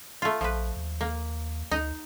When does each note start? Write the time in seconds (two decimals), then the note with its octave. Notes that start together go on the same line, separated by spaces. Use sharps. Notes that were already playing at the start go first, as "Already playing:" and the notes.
0.22 A3 F4
0.41 A#1 F3 B4
0.77 D#2
1.01 A#3
1.71 D2 D#4